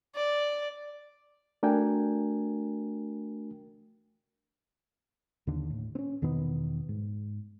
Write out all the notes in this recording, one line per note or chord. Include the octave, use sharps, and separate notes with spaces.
D5
A3 D4 F#4 A#4 G5 G#5
D#2 D3
A2
C4 C#4
E2 B2 D#3 B3
G#2